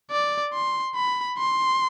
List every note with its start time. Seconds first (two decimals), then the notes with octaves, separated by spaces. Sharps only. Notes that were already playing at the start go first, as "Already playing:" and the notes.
0.11 D5
0.53 C6
0.95 B5
1.38 C6